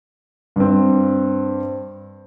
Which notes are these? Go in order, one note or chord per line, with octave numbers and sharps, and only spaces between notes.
G2 C4